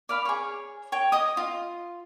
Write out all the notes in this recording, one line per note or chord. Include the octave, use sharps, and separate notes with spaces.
D5 F5 B5
G#4 C#5
C#5 G5
D#5 D#6
F4